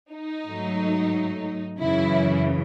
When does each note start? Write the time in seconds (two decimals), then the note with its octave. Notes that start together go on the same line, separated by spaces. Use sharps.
0.13 D#4
0.46 G#2 F#3 A3
1.79 F#2 C#3 E3 E4